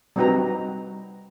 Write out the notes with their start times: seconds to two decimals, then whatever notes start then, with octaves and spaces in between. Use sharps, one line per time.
0.16 G3 C4 D#4 F#4 B4 A#5